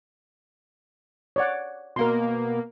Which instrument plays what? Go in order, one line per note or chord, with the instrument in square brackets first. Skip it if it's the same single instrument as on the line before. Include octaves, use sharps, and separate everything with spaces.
[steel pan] C#5 D5 F#5
[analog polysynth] B2 A#3 [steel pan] A#4 C6